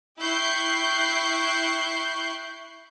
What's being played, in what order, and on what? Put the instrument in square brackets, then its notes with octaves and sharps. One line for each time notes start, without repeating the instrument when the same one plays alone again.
[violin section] E4 G5 C#6 F#6 G6 C7